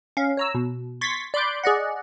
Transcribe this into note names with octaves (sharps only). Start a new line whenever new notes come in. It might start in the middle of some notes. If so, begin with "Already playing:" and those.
C#4 F5
C#5 A#5 E6
B2
C6 C#6 G#6 A6 B6
D5 B5 C6 D6 F#6 G6
G#4 D5 D#5 F#5